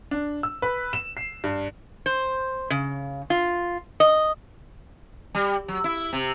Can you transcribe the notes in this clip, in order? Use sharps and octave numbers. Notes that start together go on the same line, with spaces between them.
D4
E6
B4
E7
C7
G2
C5
C#3
F4
D#5
G3
F#3
E4
C3